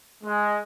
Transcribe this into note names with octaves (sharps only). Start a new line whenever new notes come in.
G#3